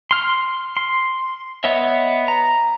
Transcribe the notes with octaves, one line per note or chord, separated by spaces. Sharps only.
C6 F6
C6
B3 C#5 D#5 E5
A#5